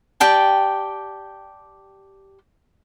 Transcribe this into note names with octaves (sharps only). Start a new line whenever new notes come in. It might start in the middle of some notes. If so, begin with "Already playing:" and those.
G4 D5 G5 A5